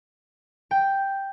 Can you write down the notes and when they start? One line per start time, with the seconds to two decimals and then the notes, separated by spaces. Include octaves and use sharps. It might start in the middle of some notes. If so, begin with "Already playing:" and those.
0.71 G5